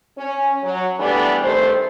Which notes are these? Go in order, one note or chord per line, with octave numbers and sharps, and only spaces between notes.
C#4
F#3
E3 G3 A3 B3 D4
G2 C3 D#3 A3 C5